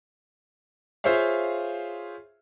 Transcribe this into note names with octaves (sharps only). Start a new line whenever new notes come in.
F4 G#4 C5 C#5 E5 F5